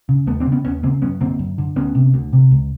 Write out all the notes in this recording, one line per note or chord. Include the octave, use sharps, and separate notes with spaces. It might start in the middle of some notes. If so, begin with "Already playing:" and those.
C#3
D#2 A3 B3
C4 D4
C#3
B3 C#4
D#2 B3 C#4
C#3 A#3 C4
F#2 B3 C#4
D3 A#3 C4
F#2
D3
D2 B3 C#4
C3
D2
C3
C#2